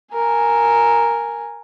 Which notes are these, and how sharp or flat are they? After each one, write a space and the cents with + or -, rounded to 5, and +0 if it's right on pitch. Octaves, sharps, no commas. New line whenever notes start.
A#4 +0 G#5 +0